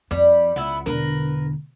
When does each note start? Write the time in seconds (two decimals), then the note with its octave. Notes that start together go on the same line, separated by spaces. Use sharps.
0.11 F2 G3
0.56 C#2 B3 E4
0.86 E1 D3 A#4 B4